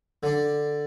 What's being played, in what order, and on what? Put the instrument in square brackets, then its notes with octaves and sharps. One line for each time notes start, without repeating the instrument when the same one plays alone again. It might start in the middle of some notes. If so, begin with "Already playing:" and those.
[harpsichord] D3 D4